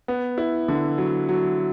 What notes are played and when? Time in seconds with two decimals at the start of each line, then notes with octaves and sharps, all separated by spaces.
0.08 B3
0.38 E4
0.68 D3
0.98 F#3
1.29 F#3